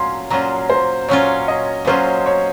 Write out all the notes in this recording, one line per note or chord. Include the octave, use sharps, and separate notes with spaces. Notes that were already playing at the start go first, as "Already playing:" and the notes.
Already playing: A#2 F#3 C#4 F4 C6
A#2 F#3 C#4 F4 A#5
C5
A#2 F#3 C#4 F4 C#5
D#5
A#2 F#3 C#4 F4 C5
C#5